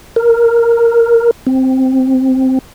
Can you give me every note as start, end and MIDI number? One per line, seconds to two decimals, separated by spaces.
0.16 1.31 70
1.47 2.59 60